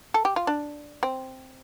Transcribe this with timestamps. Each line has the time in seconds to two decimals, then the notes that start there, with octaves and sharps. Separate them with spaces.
0.14 A4
0.25 G4
0.36 F4
0.47 D4
1.03 C4